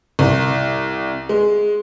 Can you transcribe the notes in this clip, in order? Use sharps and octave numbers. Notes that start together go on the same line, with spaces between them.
C2
G#3